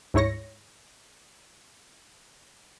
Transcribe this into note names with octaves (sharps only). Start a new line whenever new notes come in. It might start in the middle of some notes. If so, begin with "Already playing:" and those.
D2 G#2 E4 C#5 A#6 C#7